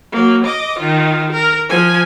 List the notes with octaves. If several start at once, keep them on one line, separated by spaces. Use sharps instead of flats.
F#3 A#3
D#5 D6
D#3 F4
A#4
F3 G#5